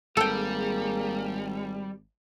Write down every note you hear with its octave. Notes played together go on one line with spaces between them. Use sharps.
G#1 G3 A#3 G#4 A4 G5